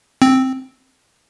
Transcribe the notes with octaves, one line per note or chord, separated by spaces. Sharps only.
C4